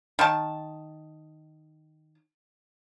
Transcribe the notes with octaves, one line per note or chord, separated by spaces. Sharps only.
D#3 A5